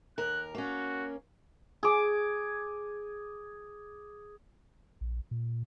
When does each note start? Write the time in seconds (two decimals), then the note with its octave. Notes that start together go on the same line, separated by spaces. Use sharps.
0.18 D#2 A#4 F#6
0.55 A#3 C#4 F#4
1.83 G#4 D6
5.01 A#1
5.31 A#2